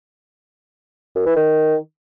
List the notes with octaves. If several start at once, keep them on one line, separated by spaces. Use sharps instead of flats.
F#2
E3
D#3